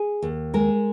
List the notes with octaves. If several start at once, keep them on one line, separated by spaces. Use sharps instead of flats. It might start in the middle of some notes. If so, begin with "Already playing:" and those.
Already playing: G#4
D#2
G#3 A#4